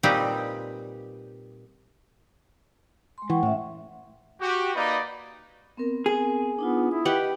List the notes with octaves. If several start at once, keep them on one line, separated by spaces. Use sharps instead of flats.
A#2 G3 C4 D#4 G4 B4
G#3 C6
E3 F#5 G5 C#6
A2 C#4 E5
F#4 G4
A#3 D#4 B4 D5 D#5
B3 C4 A#4
G#4
B3 D4 D#4 F4
E4 D#6
G4 B4 D#5 F#5 G5